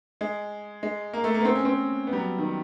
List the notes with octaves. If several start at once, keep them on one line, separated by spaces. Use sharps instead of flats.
G#3
G#3
A#3
A3
A#3
B3
C4
C#4
C4
B3
G3
F#3
D#3